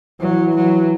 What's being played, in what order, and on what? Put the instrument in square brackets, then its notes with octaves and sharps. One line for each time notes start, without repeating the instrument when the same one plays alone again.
[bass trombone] E3 [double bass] F#3
[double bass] F#3